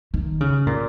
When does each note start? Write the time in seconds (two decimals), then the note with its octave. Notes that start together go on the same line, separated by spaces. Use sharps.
0.14 D#3
0.41 C#3
0.67 A#2